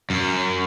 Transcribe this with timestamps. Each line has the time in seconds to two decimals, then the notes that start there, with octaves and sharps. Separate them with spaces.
0.10 F#2